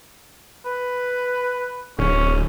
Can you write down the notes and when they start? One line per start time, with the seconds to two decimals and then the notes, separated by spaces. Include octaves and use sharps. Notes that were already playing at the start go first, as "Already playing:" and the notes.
0.66 B4
1.99 D1 C#4